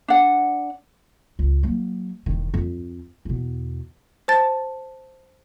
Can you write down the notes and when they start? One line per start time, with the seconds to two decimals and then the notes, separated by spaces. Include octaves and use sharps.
0.08 D4 F#5
1.39 C#2
1.63 F#3 A#3
2.26 E1 D#3
2.54 F2
3.25 E2 B2
4.28 C5 A5 A6